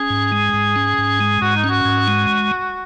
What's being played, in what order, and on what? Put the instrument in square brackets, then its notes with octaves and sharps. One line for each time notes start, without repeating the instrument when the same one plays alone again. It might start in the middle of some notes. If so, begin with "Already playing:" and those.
Already playing: [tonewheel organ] C#4 [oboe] G#4
[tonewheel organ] G#2
G#3
G#2
C#4
G#2
G#3
[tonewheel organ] G#2 [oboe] F#4
[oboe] D#4
[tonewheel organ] C#4
[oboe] F#4
[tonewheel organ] G#2
G#3